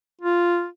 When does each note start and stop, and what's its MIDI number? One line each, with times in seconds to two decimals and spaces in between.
0.22 0.66 65